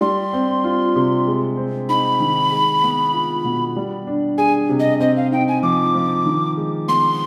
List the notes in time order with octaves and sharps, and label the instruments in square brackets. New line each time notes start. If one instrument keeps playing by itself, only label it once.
[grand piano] G3 [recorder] C6
[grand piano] C4
F4
C3
G#3
C4
[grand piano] D#4 [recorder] B5
[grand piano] D#3
G#3
B3
F4
B2
G3
D4
[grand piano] G#4 [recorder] G#5
[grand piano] C3
[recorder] D#5
[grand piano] C4 [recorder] D#5
[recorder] F5
[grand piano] D#4 [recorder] G5
[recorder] G#5
[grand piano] F3 [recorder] D6
[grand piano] F3
D#3
G#3
[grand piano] B3 [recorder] C6